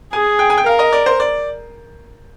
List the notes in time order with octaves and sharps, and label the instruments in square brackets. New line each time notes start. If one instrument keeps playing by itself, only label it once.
[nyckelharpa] G#4 [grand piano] G#5
[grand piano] G5
G#5
G5
[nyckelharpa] A#4 [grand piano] F5
[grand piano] D#5
D5
C5
D5